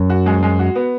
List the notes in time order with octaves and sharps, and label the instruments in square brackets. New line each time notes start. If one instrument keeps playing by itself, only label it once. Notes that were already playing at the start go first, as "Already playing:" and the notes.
Already playing: [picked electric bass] F#2
[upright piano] F#4
G#3
G#3
F#4
B3